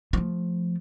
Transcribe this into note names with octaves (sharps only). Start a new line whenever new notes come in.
F3 A3